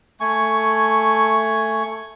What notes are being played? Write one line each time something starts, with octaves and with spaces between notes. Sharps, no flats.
A3 G#5 C#6